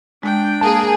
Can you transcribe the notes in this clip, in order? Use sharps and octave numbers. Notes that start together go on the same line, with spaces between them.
G#3 D4 G5
A#3 G#4 A5